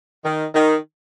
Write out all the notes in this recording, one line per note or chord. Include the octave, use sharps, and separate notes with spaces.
D#3
D#3